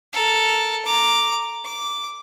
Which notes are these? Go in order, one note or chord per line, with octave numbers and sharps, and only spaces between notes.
A4 A#4
A#5 D6
D6